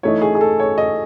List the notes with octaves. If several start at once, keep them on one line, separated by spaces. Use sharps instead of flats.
E3 A3 D#4 C#5
G#4
G#4
A4
C#5
D#5